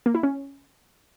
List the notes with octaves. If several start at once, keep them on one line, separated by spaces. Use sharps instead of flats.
A#3
E4
C#4